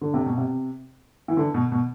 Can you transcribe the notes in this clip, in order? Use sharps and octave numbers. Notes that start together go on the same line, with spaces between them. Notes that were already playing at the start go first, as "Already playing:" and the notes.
D3
C3
B2
C3
E3
D3
B2
B2